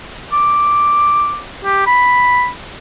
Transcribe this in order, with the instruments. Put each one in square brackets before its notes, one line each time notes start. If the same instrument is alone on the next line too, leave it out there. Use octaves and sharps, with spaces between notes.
[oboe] D6
G4
B5